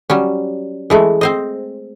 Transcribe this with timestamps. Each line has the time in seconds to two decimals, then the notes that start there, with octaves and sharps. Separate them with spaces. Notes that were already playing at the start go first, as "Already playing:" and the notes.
0.10 F#3 G3 C#4
0.90 E3 G#3 A3
1.21 C4 C5 D#5